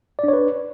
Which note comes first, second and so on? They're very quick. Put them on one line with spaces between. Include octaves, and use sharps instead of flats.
D5 D4 C#5 B4